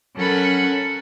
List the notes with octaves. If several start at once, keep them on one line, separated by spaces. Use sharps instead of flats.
F#3 C#4 A4 A#4 F#5 B5